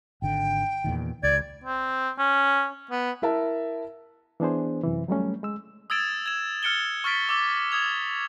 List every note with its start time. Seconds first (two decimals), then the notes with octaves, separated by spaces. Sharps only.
0.22 G#1 D3 G5
0.84 E2 A#2 D#3
1.23 C#2 D5 G#6
1.64 C4
2.19 C#4
2.91 B3
3.22 E4 A#4 E5 A5
4.40 E3 B3 D4 G#4 C5
4.83 F#2 C3 E3
5.08 F#3 G3 A3 C#4
5.43 G#3 E6
5.90 D#6 E6 G#6 A6 D7 E7
6.26 G#6 E7
6.63 F6 F#6 C#7 D7 E7 G7
7.04 C#6 F6 A6 B6 D7
7.29 D6 E6 A6
7.72 D#6 G#6 F7